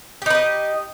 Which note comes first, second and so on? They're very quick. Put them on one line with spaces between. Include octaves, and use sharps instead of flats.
G4 D#4 B4 D#5